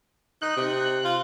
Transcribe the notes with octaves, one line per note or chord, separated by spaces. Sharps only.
D#4 F#6
C3
F4